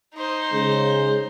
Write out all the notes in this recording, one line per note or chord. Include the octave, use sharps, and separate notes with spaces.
D#4 C5
C#3 G#3